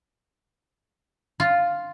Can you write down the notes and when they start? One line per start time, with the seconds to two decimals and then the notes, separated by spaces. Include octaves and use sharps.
1.40 F4